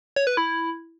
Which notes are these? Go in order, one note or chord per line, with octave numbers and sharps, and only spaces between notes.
C#5
B4
E4